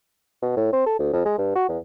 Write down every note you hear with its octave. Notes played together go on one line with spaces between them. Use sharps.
B2
A2
C4
A4
D2
F2
G#3
G2
F#4
E2